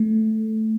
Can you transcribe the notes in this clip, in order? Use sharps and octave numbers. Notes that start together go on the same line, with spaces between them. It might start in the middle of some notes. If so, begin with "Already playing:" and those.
Already playing: A3